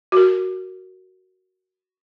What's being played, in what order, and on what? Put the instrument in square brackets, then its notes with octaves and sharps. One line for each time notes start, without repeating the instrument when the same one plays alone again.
[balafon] F#4 A#4